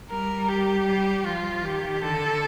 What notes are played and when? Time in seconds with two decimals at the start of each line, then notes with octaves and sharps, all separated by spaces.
0.10 G3 A#4
0.48 G4
0.87 G3
1.25 F3 F4
1.64 D#3 G4
2.02 D3 A4